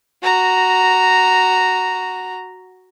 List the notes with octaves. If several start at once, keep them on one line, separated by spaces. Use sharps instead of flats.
F#4 A#5